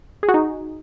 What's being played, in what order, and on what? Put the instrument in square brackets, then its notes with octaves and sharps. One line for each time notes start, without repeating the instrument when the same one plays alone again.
[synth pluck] G#4
F#4
D#4